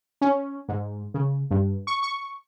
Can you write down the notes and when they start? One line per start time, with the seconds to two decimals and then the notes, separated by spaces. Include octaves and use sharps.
0.21 C#4
0.69 G#2
1.14 C#3
1.51 G2
1.87 C#6
2.03 C#6